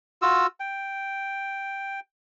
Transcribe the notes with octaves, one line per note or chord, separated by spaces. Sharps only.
F4 F#4 E6
G5